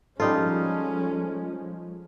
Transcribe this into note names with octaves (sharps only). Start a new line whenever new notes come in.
F3 G3 G#3 C#4 D#4 F4 A4